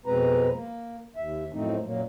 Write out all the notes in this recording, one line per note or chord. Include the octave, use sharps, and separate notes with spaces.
F2 B2 G#3 C4 B4 A#5
A#3
D#2 E5
F#2 A2 F3 A3 C4 D#4
F#2 A#2 F#3 A#3